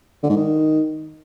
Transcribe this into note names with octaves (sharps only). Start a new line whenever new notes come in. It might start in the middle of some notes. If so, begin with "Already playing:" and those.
D3
G#2
D#3